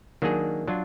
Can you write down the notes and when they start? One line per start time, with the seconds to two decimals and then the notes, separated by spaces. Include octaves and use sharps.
0.22 D#3 F#3 A#3 D4 G#4
0.68 F#3 D4 F4